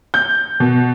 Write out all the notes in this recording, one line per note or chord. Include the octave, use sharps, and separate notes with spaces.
G6
B2